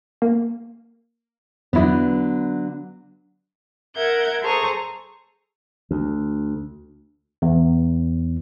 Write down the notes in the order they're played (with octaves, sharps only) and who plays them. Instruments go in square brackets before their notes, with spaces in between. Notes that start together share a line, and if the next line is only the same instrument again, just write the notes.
[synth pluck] A#3
[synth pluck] E2 E4 [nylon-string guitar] D3 F#3 B3
[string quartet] A#4 E5 F#5 G6 G#6
G#4 A4 C5 A#5 C#6 D#6
[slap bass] D2
[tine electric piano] E2